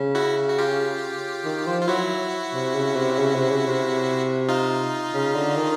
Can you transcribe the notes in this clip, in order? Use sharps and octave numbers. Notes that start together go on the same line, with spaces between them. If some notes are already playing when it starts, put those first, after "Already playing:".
Already playing: C#3
E4 F#4
F#4
F4 G4
D#3
F3
F4
F#3 E4 F#4
C3
C#3
C3
C#3
C3
C#3
C3
D#4 F4
C#3
D3
D#3